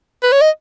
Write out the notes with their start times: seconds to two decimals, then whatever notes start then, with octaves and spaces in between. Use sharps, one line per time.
0.23 B4
0.32 C#5
0.41 D#5